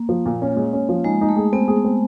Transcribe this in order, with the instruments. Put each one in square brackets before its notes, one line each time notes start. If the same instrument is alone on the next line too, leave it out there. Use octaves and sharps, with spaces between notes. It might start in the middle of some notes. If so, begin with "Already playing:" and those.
Already playing: [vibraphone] A#3
[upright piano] F3
A#2
C#4
G#3
C#4
F3
[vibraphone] G#3 [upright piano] D#4
[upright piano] D#4
[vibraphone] A3
[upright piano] G#4
[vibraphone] B3 [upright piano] C4
[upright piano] G#4
C4